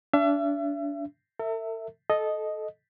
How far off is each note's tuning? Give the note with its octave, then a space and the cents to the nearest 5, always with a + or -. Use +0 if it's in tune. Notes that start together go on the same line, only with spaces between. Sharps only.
D4 -25 E5 +35
A4 +45 E5 -5
A4 -20 D#5 +0